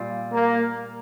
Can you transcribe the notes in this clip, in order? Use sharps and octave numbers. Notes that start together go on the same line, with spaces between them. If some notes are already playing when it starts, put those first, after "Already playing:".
Already playing: A#2 G3 F4
A#3